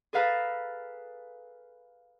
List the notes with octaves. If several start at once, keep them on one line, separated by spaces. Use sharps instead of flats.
G#4 A4 B4 F5 A#5